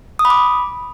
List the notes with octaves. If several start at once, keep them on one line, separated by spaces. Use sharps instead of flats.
D#6
B5
D6